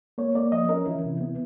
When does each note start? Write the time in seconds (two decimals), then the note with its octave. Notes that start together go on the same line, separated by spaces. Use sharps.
0.18 A#3 C#5
0.35 A#3 D5
0.52 F3 D#5
0.69 C#4 A#4
0.87 E3 E4
1.04 C3
1.21 B3